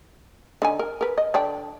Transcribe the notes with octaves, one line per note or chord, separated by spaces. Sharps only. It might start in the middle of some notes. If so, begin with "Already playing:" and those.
D3 D#4 G#5
A#4
A#4 B4
D#5
D3 D4 G5